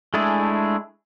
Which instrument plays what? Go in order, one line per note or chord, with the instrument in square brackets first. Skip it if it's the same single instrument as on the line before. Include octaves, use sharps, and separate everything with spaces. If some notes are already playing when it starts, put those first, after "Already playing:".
[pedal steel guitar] G#3 A3 D4 E4 G#4